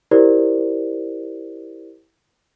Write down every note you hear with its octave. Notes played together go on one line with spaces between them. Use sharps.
E4 G4 A#4 C5 D5